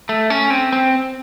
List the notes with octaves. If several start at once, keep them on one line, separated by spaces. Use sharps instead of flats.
A3
C#4
C4
C4